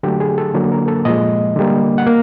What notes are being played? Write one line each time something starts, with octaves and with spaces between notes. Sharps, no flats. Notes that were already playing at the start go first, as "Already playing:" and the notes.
D3 F#3 A3 G4
G#4
A4
D3 F#3 A#3
A#4
A4
A#2 F3 G#3 D#5
D3 G3 A#3
F#5
A#3